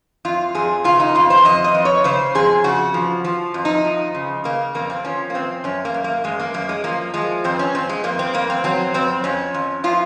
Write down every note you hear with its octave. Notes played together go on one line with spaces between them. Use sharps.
F2 F4
F2 G#4
C#3 F4
D#4
F2 F4
C5
F2 D#5
D#5
F2
C#5
C#3 C5
F2 G#4
C#3 F#4
F3
F3
F2
D#4
F3
C#3
C#3 A#3
F2 A#3
C4
F3 C#4
A#3
F#2 C4
F#2 C#4
A#3
F#2
A#3
F#2 G#3
A#3
F#2 A#3
G#3
F3 A#3
F3 G#3
F2 C4
C#4
F2 C4
G#3
F2 A#3
C4
F2 A#3
C4
F#3 C4
F2 C4
F2 C#4
F2
F3 F4